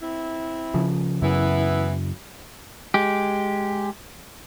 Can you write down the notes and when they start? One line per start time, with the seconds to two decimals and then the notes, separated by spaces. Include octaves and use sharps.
0.02 C4 E4
0.74 C#3 F3
1.22 F#2 C#3 E3 B3 E4
2.94 G#3 G4